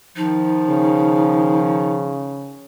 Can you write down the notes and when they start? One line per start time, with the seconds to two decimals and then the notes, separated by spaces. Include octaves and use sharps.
0.17 D#3 F3 D#4
0.69 C#3